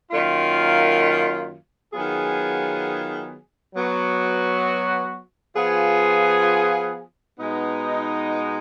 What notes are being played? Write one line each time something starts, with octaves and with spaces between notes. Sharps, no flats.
F#2 D#3 A#3 F4
D#3 F#3 B3 F4 G#4
F#3 B3 F#4
F3 B3 F4 G#4
B2 G#3 B3 D#4